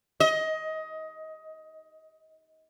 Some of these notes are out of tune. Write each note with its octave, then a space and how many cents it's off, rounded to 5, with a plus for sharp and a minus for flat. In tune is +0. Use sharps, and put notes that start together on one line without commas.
D#5 +20